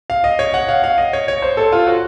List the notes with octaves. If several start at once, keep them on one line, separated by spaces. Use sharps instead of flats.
F5
D#5
C#5
F#5
F5
F5
D#5
C#5
C#5
C5
A4
F4
F#4